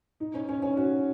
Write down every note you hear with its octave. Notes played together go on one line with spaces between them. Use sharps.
D#4
C#4
C#4
C#4
F#4